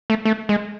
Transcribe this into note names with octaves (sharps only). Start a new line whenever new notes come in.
A3
A3
G#3